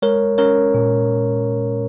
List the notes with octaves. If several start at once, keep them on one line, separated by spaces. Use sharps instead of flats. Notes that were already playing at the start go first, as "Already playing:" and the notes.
G#3 A#4 C#5
C#4 A#4 C#5
A#2